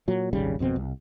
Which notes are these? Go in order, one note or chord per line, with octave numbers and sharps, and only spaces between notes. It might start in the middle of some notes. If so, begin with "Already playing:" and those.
A#2 F#3
D#1 G#1 C#3 G3
G#1 F2 B2 C4
C2